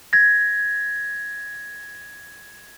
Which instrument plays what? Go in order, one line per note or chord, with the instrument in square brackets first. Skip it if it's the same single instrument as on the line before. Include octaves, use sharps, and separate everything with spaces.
[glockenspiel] G#6 A#6